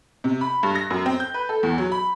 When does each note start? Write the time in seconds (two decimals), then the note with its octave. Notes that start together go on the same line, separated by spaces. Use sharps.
0.24 C3
0.41 B5
0.63 G2
0.75 A#6
0.90 F#2
1.06 C4
1.20 G6
1.34 B4
1.49 A4
1.63 E2
1.78 F#3
1.92 B5